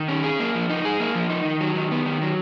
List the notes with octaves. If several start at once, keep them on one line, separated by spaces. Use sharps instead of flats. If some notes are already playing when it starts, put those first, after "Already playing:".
Already playing: D#3
C#4
G#4
A#3
F3
D#4
G#4
A#3
F3
D#4
D#3
F#3
D#3
B3
D#3
F#3